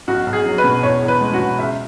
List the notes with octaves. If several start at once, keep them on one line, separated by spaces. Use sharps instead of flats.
B1 F#4
B1
G#4
F#3
B4
B2
E2 C#5
E2
B4
G#3
F#4
B2
C#2 E5